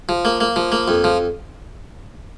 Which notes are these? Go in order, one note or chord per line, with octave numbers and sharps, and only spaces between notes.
F3
A#3
A#3
F3
A#3
F2
F3